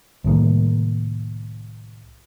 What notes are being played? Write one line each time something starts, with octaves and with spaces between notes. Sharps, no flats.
C2 A2 D#3 A#3